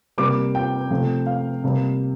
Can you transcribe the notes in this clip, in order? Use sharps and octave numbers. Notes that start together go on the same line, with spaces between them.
C3 G3 A#3 D6
G5
C3 F3 A3
F5
C3 G3 A#3